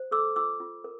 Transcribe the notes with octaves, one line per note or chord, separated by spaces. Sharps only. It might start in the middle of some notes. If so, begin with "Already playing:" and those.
Already playing: C5
A4 D6 E6
F4 D6 E6
F4
A#4